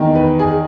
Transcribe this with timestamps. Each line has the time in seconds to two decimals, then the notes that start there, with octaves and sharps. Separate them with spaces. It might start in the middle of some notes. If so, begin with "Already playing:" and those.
Already playing: E2 D#3
0.15 B4
0.39 G#4